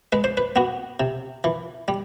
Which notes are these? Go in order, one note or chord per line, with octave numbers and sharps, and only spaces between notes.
G#3 B4
C5
B4
B3 F#4
C3
E3
G3